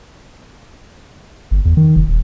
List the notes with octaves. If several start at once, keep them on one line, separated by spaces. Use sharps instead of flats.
G1
E2
D#3
F1
D#1